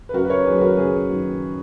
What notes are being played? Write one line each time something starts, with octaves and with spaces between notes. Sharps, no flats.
B4
F#2 F#4 A#4
B4
A#4 C#5
D#3 F#3 G#4 B4
B4
F#4 A#4
A#4
F#2 G#4 B4
D#3 F#3